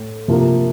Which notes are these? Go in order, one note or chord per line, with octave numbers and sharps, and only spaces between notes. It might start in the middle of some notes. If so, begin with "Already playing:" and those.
Already playing: A2
C3 F3 A#3